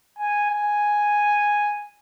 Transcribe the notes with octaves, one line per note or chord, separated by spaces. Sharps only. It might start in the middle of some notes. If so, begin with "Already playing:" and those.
G#5
G#5